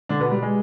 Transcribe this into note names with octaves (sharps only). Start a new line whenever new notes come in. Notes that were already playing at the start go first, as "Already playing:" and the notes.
D3 D4
B2 B3
G3
G#3